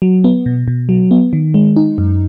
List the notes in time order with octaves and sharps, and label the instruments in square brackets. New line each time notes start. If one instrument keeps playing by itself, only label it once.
[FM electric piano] F#3
B3
B2
B2
F#3
B3
D#3
G#3
D#4
F#2